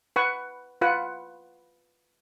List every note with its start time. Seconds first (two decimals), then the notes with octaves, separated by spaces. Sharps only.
0.16 B4 F#5 C#6
0.81 F4 B4 F#5